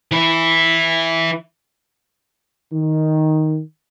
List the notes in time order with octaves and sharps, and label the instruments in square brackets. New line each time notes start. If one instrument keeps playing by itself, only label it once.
[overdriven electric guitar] E3 E4
[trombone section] D#3